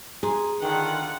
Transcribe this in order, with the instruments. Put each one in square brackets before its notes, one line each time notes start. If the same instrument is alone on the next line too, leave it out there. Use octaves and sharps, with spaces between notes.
[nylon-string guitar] G#4 [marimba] G#5 A#5 C6
[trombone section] D3 D#3 [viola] F4 F#5 [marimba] G5